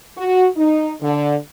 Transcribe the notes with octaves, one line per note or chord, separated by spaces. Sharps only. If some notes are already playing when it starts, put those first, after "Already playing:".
F#4
D#4
D3